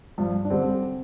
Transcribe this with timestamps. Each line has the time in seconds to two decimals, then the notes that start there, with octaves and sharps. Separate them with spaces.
0.18 G2 F3
0.45 D4
0.50 D3 G3 C4